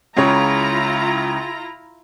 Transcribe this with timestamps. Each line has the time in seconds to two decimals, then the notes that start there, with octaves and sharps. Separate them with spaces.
0.17 C#2 C#3 E4 F4 C#5 A#5